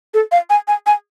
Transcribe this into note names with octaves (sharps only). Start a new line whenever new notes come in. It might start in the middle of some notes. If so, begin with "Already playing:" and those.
A4
F5
G#5
G#5
G#5